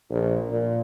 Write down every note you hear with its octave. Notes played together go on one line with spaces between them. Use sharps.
A#1
A#2